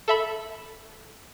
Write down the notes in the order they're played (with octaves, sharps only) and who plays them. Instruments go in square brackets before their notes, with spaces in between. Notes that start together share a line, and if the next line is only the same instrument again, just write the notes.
[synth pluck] A4 E5 B5